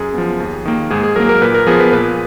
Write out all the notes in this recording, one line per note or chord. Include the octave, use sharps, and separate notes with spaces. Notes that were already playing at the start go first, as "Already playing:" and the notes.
Already playing: F#2 G#4
F3 B3
D#2
D#3 A#3
G#2 G#4
G#4
F#3 A#3 A#4
A#4
A#2 B4
A#4
F3 B3 G#4
B4
A#2 B4